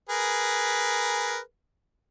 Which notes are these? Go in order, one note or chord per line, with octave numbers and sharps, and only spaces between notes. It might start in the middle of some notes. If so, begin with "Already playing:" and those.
G#4 A#4 B4